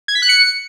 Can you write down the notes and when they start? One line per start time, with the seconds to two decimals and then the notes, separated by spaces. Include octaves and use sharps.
0.08 G#6
0.15 B6
0.22 F#6
0.29 C#7